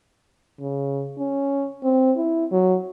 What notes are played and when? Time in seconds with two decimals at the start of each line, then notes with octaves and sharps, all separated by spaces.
0.60 C#3
1.18 C#4
1.83 C4
2.17 E4
2.52 F#3